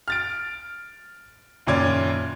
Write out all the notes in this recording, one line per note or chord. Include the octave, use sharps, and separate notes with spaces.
F6 A6 D7
F#1 A#2 D#3 C#4 D5 G#6